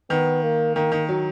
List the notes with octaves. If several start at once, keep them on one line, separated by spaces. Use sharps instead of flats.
D#3 B3
A#3
D#3 A#3
D#3
F#3